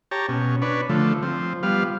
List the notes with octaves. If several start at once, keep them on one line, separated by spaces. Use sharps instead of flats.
G4 C#5 A5 A#5
B2 C#4
D4 B4 C#5
D3 F3 A3
F3 C4
F3 G3 B3 F5